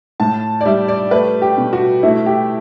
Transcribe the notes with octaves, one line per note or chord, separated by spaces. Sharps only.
A2 A5
D5
G3 E5
D5
A3 B4
G4
B2
F#4
A3 E4
G4